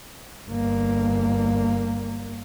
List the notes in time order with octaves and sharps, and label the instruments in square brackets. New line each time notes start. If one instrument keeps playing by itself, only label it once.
[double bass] G1 A#3